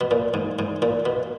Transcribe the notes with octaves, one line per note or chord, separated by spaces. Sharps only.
B2
A#2
G#2
G#2
A#2
B2